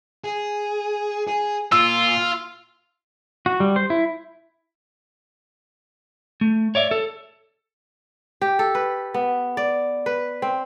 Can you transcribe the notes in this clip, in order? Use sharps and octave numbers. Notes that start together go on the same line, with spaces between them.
G#4
G#4
A#2 F4 E6
F#4
G3
C5
E4
A3
C#5 D5 E5
A4
G4
A4
B4
B3
D5
B4
C4